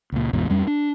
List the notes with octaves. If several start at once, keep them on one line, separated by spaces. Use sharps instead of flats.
C#2 A#2
A1 E2 G#2 B2
F2 G3 C#4
D4